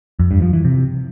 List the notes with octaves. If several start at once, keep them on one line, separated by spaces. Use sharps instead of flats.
F2
G2
F3
E3
C3